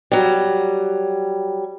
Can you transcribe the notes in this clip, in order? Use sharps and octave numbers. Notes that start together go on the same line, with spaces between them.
F#3 G3